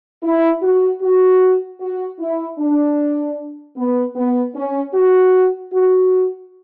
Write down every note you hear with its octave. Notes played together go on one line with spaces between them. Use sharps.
E4
F#4
F#4
F#4
E4
D4
B3
B3
C#4
F#4
F#4